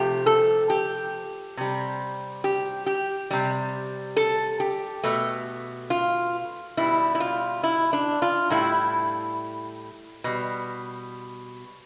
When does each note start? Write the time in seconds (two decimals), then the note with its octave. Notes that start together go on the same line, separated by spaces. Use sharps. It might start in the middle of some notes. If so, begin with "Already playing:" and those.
Already playing: C3 F3 A3 G4
0.26 A4
0.70 G4
1.57 C3 G3
2.44 G4
2.86 G4
3.31 C3 G3
4.17 A4
4.60 G4
5.03 B2 A3
5.90 F4
6.77 B2 G3 E4
7.15 E4
7.20 F4
7.63 E4
7.93 D4
8.22 F4
8.50 A2 G3 E4
10.24 B2 G3